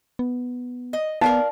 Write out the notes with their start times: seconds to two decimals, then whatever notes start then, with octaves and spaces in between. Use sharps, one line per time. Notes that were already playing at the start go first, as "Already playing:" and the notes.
0.19 B3
0.93 D#5
1.21 B3 D#4 A#4 D5 F5